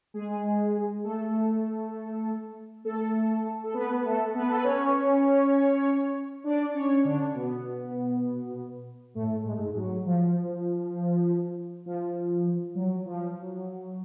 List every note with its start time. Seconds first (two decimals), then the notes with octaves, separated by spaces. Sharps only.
0.14 G#3 G#4
1.04 A3 A4
2.84 A3 A4
3.64 A4
3.74 B3 B4
4.04 A3 A4
4.34 B3 B4
4.49 A4
4.56 B4
4.64 C#4 C#5
6.44 D4 D5
6.74 C#4 C#5
7.04 D3 D4
7.34 B2 B3
9.15 A2 A3
9.45 G#3
9.52 A3
9.59 G#2 G#3
9.76 F#3
10.05 F3
11.86 F3
12.75 F#3
13.06 F3
13.36 F#3